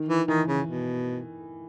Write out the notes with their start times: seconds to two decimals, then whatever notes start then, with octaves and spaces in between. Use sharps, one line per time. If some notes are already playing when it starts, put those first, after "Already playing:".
Already playing: D#3
0.09 E3
0.28 D#3 E3
0.48 C#3
0.67 B2